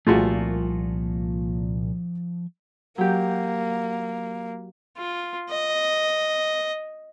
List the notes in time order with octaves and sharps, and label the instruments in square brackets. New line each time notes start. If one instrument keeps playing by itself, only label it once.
[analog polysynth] C2 A#2 [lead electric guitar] F3 G#5 [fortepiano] A3 F4 F#4
[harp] F#3 G4 [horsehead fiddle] A#3
[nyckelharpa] F4
D#5